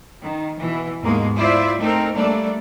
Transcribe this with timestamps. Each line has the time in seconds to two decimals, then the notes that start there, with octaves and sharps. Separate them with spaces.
0.21 D#3
0.59 B2 E3
1.03 D#2 G#2 B2 G#3 A#3 A#4
1.37 E4 F4 C5 D5 E5
1.79 A3 C4 D#4 A4 A#4
2.15 G3 A3 A#3 D4 A4 D5